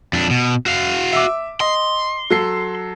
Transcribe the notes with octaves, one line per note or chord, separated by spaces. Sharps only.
F2 D4
B2
F#4 F5
E5 D6
D#5 C6
F#3 A4 C7